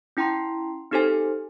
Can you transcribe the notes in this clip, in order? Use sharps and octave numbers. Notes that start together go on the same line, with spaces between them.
C#4 E4 G5 A#5 C6
C4 D#4 G4 A4 C5 G#5